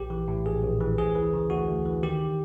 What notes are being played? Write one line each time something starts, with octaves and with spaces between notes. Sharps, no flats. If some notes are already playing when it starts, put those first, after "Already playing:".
Already playing: A#1 G4
E3
A2
A#1 G#4
A#1
E3
D2 G#4
E3
C#3
D2 F#4
D2
E3
D#3 G4